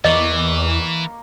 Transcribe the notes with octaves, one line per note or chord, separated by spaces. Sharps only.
E2 E3 A#3 D#5 C#6